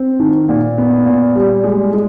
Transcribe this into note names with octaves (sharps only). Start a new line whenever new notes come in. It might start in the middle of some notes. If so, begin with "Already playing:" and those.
Already playing: C4
D#3
A#2
B3
A#2
G3
G#3
G#3